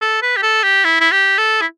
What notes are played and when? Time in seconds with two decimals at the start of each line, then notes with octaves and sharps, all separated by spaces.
0.02 A4
0.22 B4
0.37 G4
0.43 A4
0.63 G4
0.84 E4
1.01 E4
1.12 G4
1.38 A4
1.61 E4